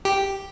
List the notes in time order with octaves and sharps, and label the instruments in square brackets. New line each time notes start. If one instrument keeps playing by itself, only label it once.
[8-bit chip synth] G4